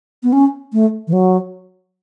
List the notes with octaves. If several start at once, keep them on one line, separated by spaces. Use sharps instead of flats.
B3
C#4
A3
E3
F#3